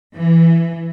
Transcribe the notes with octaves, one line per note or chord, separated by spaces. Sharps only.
E3